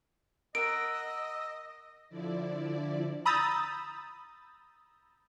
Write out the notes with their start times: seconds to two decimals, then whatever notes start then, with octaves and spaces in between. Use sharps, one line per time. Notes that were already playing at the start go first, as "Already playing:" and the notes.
0.55 A#4 D#5 F#5 E6 D7
2.09 D3 F3 E4 D5
3.25 A#5 B5 D#6 E6 G6 A6